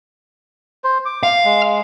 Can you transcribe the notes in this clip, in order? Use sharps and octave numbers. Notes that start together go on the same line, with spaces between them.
C5
D6
F5
G#3